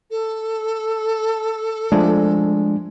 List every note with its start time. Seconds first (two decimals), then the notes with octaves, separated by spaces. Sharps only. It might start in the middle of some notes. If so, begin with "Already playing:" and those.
0.10 A4
1.92 F3 G#3 A3 D4